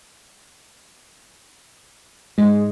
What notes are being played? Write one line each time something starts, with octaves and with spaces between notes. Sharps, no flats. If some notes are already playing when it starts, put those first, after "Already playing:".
G#2 G#3